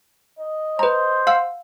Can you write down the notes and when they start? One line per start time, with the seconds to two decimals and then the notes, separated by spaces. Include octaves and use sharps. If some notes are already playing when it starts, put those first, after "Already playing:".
0.38 D#5
0.79 B4 C5 A#5
1.27 F5 F#5 E6